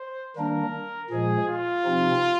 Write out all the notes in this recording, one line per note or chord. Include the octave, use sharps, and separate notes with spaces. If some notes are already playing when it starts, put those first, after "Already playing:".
Already playing: C5
D#3 G3 A#3 D4 A#4
A#2 F3 G#3 G#4
F4
C3 F3 C4 D#4